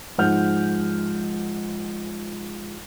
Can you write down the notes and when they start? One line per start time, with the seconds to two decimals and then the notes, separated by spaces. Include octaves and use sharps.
0.18 G#2 F3 G#3 F#5 F6 G6